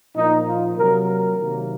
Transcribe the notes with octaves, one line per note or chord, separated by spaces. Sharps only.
A#2 F3 A#3 D#4
F4
C3 F#3 A#3 A#4
A#4
C3 D#3 F#3 A#3